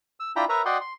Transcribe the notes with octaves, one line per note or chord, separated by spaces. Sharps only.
E6
D4 E4 F4 G5 A#5 B5
A#4 B4 C#5 E5 A#5
F#4 D5 D#5 F#5 G5 C6
C6